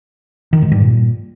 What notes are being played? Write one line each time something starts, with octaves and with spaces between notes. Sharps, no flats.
D#3
G#2
G2
A#2